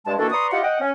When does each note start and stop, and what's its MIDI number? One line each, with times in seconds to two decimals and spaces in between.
0.07 0.14 43
0.07 0.14 56
0.07 0.14 81
0.19 0.31 51
0.19 0.31 52
0.19 0.31 58
0.19 0.31 62
0.19 0.31 66
0.19 0.31 69
0.32 0.49 71
0.32 0.49 74
0.32 0.49 82
0.32 0.49 84
0.32 0.49 85
0.32 0.49 87
0.52 0.62 64
0.52 0.62 65
0.52 0.62 67
0.52 0.62 75
0.52 0.62 78
0.63 0.77 75
0.63 0.77 78
0.63 0.77 79
0.80 0.91 61